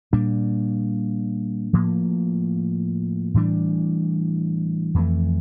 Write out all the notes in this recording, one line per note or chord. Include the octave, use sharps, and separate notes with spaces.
A#2 G3 A#3 D4
A2 F3 A#3
A2 E3 G3 D4
F2 E3 A3